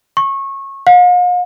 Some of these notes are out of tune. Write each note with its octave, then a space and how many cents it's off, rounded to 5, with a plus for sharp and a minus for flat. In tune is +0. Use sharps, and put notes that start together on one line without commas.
C#6 -20
F5 +45